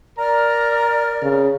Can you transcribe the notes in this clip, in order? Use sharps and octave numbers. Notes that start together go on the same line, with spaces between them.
A#4 D5 A#5 F6
C#3